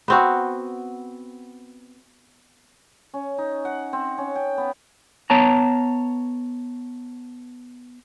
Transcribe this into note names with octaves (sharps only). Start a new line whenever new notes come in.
B3 C4 F#4
C#4
D#4
F#5
C4
C#4
G5
B3
B3 C#5 A5 A#5